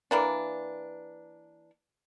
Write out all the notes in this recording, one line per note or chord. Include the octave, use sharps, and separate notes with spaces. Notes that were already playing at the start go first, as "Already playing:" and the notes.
E3 A#3 D4